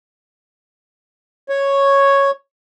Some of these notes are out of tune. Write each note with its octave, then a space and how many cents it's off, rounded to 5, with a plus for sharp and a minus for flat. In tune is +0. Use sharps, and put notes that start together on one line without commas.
C#5 -5